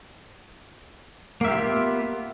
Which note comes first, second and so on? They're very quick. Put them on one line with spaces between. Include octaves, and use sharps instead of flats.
A#3 E5 G4 F4 B3